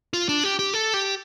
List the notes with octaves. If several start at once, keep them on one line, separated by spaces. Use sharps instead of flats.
F4
D4
G4
G4
A4
G4